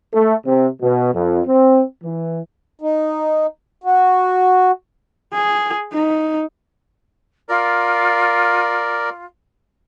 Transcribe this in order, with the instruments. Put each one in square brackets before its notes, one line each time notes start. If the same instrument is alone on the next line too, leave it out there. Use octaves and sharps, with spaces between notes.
[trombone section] A3
C3
B2
F2
C4
E3
[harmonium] D#4
F#4
[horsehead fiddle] G#4
D#4
[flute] F4 [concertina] A#4 D5